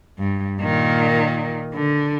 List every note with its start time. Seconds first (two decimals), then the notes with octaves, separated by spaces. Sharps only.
0.19 G2
0.61 A#2 D#3
1.75 D3